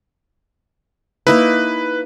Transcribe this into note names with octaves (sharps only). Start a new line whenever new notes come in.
A#3 D#4 E4 B4